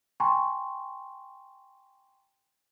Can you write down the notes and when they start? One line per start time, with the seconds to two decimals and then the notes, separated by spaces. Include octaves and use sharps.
0.20 G5 G#5 A#5 C6 C#6